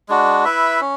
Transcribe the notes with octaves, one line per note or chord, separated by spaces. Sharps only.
G#3 D4 F#4
E4 B4 E5
C#4